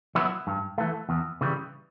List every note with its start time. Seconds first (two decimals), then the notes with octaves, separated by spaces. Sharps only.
0.15 F#3 B3 E4
0.47 G2
0.78 E3 A3
1.09 E2
1.41 C#3 E3 G3